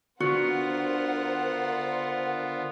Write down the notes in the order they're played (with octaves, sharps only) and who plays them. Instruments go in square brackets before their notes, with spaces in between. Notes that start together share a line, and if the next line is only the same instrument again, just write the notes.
[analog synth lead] D3 [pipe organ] B3 F4 [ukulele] F#4 [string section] A#4 C5 F#5